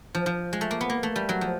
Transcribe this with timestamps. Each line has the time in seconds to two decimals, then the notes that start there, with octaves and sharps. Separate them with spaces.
0.15 F3
0.26 F3
0.53 G#3
0.61 A3
0.71 A#3
0.81 B3
0.90 A#3
1.03 A3
1.16 G3
1.29 F#3
1.41 F3